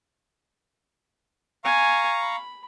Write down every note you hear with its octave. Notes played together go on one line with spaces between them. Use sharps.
F5 G#5 A#5 C#6
B5